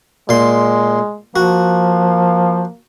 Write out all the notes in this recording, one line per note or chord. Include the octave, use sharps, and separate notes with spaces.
A#2 G#3 C6
F3 A#3 F#4